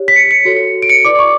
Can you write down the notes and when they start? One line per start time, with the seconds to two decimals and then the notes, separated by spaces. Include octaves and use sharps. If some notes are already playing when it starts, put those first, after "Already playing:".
Already playing: G4 C#5
0.08 B6
0.16 C#7
0.31 C#7
0.45 F#4 A4 C#5
0.82 D7
0.89 C#7
1.04 E4 B4 D5 D6
1.19 C#6